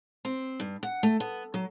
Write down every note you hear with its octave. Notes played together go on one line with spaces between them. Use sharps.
C4
G2
F#5
A3
B3
F#3